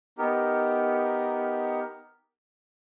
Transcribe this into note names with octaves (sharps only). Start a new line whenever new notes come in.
B3 D#4 G4 A#4